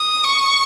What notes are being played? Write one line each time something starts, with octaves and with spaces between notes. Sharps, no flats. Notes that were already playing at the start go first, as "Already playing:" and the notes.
Already playing: D#6
C#6